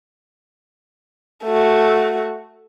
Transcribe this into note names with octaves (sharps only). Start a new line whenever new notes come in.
A3 F#4